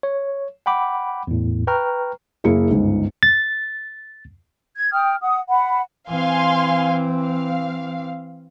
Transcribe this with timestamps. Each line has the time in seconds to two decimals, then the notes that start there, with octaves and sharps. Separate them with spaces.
0.03 C#5
0.66 F#5 G5 B5 D6
1.27 E2 A2
1.67 B4 G5 A#5 C#6 F6
2.44 F#1 A#3 E4 G#4 C#7
2.70 G1 C#2 G#2
3.23 A6
4.75 G#6
4.93 G5 D#6 F6
5.21 F#5 D#6
5.49 F#5 B5
6.09 E3 C4 F5 G#5 C6
7.22 F5